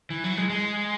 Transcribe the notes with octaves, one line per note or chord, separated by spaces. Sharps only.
E3
F#3
G#3
G#3